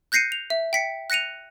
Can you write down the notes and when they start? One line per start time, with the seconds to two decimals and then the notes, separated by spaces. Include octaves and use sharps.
0.12 F#6 G6 A#6 C7 C#7 D#7
0.32 F7
0.50 E5
0.73 G5 B6 C#7
1.10 F#6 A#6 C#7 D#7 F7